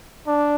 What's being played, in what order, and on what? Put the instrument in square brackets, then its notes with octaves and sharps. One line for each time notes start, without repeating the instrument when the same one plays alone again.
[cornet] D4